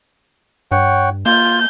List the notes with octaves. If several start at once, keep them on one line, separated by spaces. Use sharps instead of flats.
G2 C#5 F#5 G5
A#3 F4 G6